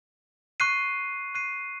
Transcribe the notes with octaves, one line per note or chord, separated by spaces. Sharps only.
C#6 F#6 C7 D#7
C#6 F#6 C7 D#7